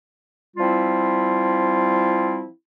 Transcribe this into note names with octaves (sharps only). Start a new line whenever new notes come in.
F3 G3 C4 E4 F4